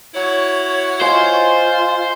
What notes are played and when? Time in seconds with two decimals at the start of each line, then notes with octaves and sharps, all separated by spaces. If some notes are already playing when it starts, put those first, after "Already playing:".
0.15 E4 F#4 C#5
1.02 F4 C5 D#5 G#5